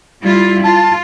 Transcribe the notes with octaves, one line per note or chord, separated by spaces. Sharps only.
G3 E4 F4
F4 A5